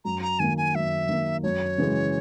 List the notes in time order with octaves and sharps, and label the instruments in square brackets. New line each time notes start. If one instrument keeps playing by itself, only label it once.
[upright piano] F#2 [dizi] A#5
[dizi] A#5
[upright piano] D#3 A#3 [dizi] G#5
[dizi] G#5
[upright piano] F#2 [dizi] E5
[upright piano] D#3 A#3
[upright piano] F#2 [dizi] C#5
[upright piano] C#3 E3 G#3